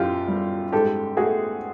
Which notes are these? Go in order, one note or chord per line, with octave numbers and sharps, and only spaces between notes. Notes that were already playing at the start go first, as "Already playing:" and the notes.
Already playing: F#2 F4 G4
G3
G#2 G4 A4
A3 F#4 G#4